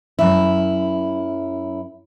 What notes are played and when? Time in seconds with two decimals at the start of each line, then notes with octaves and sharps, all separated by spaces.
0.19 F#2 E4